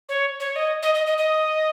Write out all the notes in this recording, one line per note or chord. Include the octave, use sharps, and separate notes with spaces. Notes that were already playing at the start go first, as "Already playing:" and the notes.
C#5
C#5
D#5
D#5
D#5
D#5
D#5